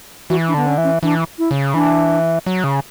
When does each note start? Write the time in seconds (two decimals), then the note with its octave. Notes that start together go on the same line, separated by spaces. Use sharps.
0.30 E3 F#4
0.48 D4
0.54 D3 B3
0.67 C#4
0.78 E3
0.84 C#4
1.03 E3 D4
1.39 E4
1.51 C#3
1.74 E3 D4
2.46 F#3
2.64 C#3